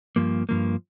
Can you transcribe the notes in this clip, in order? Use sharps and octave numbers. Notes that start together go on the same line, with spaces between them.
G2 F3 A#3
G2 F3 A#3